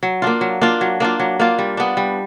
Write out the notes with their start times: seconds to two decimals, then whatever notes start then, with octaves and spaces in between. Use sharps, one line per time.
0.03 F#3
0.22 A#3 D4 F4
0.41 F#3
0.61 A#3 D4 F4
0.81 F#3
1.00 A#3 D4 F4
1.20 F#3
1.39 A#3 D4 F4
1.59 G3
1.77 B3 D4
1.97 G3